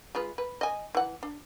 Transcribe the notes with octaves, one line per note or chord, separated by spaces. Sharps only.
G#3 F4 B4
B4
D#5 G#5
E3 F#5
D4